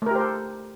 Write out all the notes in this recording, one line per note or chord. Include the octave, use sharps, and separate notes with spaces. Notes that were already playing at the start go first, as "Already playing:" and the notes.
A3 G4 A4 A#4 C5